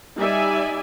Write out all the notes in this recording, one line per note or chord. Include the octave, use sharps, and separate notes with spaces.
G3 D#4 D5 E5 G#5